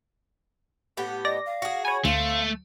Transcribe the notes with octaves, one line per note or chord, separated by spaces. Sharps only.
A2 B3 G4 F#5
D5 D#5 A#6
F5
F#4 G#4
C#5 G#5 B5
D2 A3 C4 F5